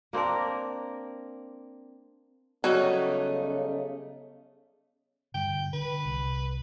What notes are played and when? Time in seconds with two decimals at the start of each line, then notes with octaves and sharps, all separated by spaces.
0.13 A#3 C4 D4 A#4
2.64 C#3 F#3 G3 A3 B3 D#4 C#5
5.34 G2 D3 G5
5.73 D3 B4
6.05 C2